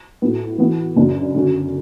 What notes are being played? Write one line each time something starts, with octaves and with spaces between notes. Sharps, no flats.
A2 F#3 B3
E3 B3 F#4
F#2 C#3 F#3 B3 D4
D3 F#3 C#4